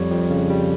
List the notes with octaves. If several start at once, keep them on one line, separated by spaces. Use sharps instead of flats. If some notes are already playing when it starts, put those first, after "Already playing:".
Already playing: F2 G3 C#5
F2
C#3
G3